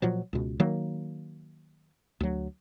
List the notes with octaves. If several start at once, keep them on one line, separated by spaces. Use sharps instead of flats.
A#2 F3 F#3
C#2 B2
D#3 F#3 A#3
D2 F#3